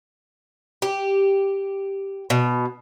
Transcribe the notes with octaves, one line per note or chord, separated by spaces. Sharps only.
G4
B2